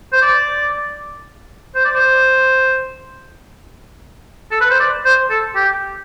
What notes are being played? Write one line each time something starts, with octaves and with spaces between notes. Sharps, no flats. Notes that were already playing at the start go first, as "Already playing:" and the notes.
C5
D5
C5
D5
C5
A4
B4
C5
D5
C5
A4
G4